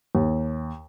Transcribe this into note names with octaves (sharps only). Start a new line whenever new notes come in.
D#2